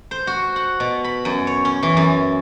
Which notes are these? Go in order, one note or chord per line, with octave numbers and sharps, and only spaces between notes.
C5
F#4
F#5
B2
B5
F#2
C#5
C#4
E3
F#2